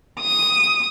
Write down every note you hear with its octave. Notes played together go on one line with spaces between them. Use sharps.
D#6